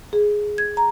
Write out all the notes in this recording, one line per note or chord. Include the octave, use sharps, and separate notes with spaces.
G#4
G#6
A#5